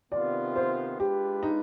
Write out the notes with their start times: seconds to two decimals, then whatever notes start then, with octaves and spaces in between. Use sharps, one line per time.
0.12 C3 D#3 B3 F4 D5
0.56 C5
0.99 G#3 D4 F4 G4 B4
1.43 D#4